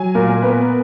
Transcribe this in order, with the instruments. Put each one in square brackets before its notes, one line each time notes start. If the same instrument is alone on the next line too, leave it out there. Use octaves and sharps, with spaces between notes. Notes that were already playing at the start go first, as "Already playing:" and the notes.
Already playing: [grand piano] F#3 [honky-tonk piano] G#5
[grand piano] A#2 [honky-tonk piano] A#4
[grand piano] B3 [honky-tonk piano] B4